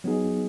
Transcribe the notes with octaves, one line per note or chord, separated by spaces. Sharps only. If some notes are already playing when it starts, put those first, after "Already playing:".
F#3 B3 D#4 G#4